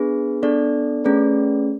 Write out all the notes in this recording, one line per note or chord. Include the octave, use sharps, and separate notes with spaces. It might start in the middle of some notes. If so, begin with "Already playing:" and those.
Already playing: B3 D4 G#4 B4
B3 D4 A4 D5
A3 C#4 G#4 B4 D5